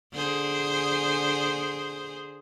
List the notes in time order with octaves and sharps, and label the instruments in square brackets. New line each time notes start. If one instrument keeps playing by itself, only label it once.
[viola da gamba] D3 G#4 C5